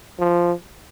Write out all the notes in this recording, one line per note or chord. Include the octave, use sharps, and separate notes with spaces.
F3